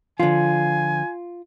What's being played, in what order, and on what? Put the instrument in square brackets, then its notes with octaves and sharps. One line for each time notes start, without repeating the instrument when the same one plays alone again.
[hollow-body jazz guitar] D3 F3 [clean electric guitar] F4 [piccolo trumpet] G#5